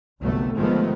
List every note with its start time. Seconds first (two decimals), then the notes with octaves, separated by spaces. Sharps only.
0.22 G1 C2 F#3 A3 B3
0.55 G1 D#3 F3 G#3 A3 B3